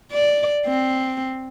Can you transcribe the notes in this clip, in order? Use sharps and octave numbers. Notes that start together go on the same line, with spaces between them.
D5
C4